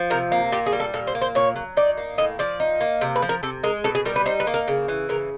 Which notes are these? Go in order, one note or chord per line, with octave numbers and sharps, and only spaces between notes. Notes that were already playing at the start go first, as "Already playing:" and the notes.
Already playing: F3
C3 A#4
A#3
A#2 G4
G#4
G3
A4
A#2 A4
C5
A#3
C5
A#2 C#5
F#3
D#4 D5
A#3
A2 D#5
F3 D5
D#4
A#3
C3
B4
F3
A#4
C3 A4
G#3 A#4
B2 A4
G#4
G3 A#4
B4
D#4 C5
B4
A#3
A#4
C#3
E3
C#3 A#4